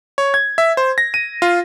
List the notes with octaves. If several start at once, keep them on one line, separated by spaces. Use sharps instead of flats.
C#5
G#6
E5
C5
A#6
D#7
F4